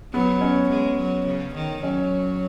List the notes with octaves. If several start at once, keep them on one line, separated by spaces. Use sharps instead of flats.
F#3 B3
C#4
G#3
F#3
C#3
D#3
F#3 C#4